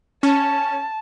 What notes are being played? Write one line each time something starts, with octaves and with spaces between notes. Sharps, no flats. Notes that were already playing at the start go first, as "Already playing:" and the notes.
C#4 A5